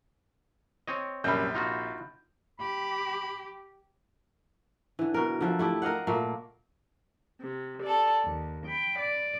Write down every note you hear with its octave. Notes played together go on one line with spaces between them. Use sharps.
C4 C#5 D#5
A#1 F#2 C3 G3 B5 G6
D#4 F4 F#4
G4 B5
D3 E3
B2 A#4
D3 F3 E5
A3 E4 G4
A#4 D#5 F5 F#5
A#2 A3 A#3
C3
A4 D5
D#2
G5 B5
D5